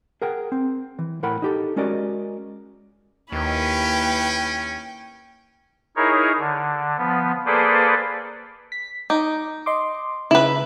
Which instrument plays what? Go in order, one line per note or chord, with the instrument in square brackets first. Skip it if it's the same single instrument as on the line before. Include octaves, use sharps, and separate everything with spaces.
[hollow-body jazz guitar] G#4 A#4 F#5 G5
C4
E3
A2 A3 A#4 F#5 G5 B5
D#4 G4 A4
G#3 C#4 F#4 A#4 D5 D#5
[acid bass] D#2 [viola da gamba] A#3 E4 B4 [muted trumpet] C#4 [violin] G5
[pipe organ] D#4 E4 G#4 A#4 C#5
D3
F3 B3
A#3 G#4 A4 B4 C5 D5
[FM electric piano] B6
[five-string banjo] D#4 [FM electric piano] D6
[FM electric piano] D#5 C6 D6
[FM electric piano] C#3 [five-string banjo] E4 B4